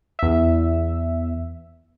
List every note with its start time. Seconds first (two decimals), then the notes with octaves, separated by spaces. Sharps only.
0.19 E2 E5